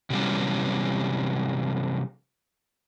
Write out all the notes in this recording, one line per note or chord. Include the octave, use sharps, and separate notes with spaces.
C3 E3 F#3 G3 B3 C#4